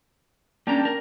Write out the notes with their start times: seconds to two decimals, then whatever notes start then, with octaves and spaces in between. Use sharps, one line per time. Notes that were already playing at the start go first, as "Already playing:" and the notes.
0.67 A#3 C#4 D4 G5 A5 A#5
0.85 A#4